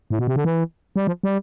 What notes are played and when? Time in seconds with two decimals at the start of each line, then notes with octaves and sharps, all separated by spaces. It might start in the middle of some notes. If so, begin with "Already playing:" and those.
0.10 A2
0.19 B2
0.27 C3
0.36 D3
0.45 E3
0.96 G3
1.07 F3
1.23 G3